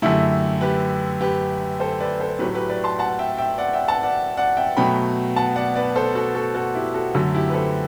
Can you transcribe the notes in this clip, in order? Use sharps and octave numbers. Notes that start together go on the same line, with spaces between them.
F#2 D3 A3 E4 G4
G4 B4
G4 B4
A4 C5
B4 D5
A4 C5
A2 F#3 A3 G4 B4
G4 B4
B4 D5
A5 C6
F#5 A5
E5 G5
E5 G5
D5 F#5
E5 G5
F#5 A5
D5 F#5
D5 F#5
E5 G5
B2 F#3 A3 G5 B5
F#5 A5
D5 F#5
B4 D5
A4 C5
F#4 A4
F#4 A4
F#4 A4
E4 G4
F#4 A4
F#2 D3 F#3 A3 F#4
E4 G4
B4
A4 C5